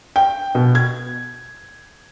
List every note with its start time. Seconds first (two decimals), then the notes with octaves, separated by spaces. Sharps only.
0.16 G5
0.55 B2
0.75 G#6